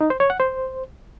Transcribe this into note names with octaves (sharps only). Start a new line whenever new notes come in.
D#4
C5
C#5
F#5
C5